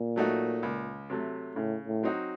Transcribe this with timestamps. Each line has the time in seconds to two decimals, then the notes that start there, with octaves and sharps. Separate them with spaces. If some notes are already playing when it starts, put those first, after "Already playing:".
Already playing: A#2
0.16 F#3 A3 D#4 F#4
0.63 C#2
1.10 C3 F#3 A3
1.55 A2 C#3
1.87 A2
2.03 F#3 C4 D#4 F#4